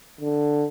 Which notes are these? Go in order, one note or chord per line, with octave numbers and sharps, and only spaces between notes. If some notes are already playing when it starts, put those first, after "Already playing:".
D3